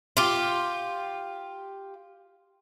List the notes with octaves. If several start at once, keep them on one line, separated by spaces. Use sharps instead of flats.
F4 G4